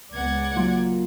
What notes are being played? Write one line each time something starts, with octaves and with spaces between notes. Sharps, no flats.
C#2 B3 D5 F#5 G#6
F#3 A#3 F4